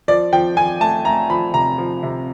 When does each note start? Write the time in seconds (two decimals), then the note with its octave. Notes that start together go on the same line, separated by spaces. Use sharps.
0.08 F3 D5
0.33 F3 G5
0.56 F3 G#5
0.80 A3 A5
1.05 A3 A#5
1.29 F3 B5
1.54 C3 A#5
1.78 F3
2.03 C3